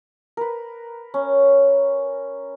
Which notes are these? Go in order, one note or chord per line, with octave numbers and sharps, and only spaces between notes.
A#4 B4
C#4